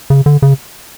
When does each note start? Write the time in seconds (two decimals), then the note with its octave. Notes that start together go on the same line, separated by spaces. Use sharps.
0.10 C#3
0.26 D3
0.42 C#3